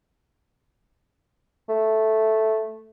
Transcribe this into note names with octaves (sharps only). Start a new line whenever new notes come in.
A3